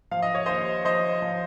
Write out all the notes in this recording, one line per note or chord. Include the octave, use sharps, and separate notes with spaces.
F3 F5
D#5
C#5
D#2 C5 D#5
F3 C5 D#5
F3